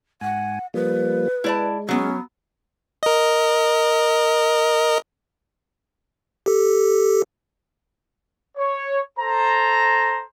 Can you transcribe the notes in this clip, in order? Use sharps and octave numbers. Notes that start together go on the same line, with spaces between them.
G#2 F#5 G#5
F3 G3 A#3 B4
G#3 E4 D5 A5
F#3 B3 C#4
A#4 D#5
G4 A4
C#5
A4 C5 A#5